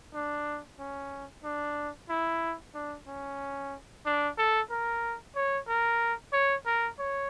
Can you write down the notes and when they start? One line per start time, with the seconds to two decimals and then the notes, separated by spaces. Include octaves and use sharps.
0.14 D4
0.79 C#4
1.44 D4
2.09 E4
2.74 D4
3.07 C#4
4.06 D4
4.38 A4
4.70 A#4
5.36 C#5
5.68 A#4
6.33 C#5
6.66 A#4
6.99 C#5